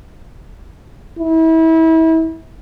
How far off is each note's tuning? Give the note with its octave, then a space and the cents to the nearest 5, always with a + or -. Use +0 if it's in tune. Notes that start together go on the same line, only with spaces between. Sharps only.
E4 -30